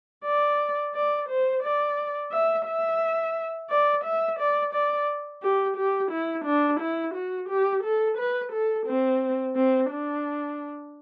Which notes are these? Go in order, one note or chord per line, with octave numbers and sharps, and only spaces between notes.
D5
D5
C5
D5
E5
E5
D5
E5
D5
D5
G4
G4
E4
D4
E4
F#4
G4
A4
B4
A4
C4
C4
D4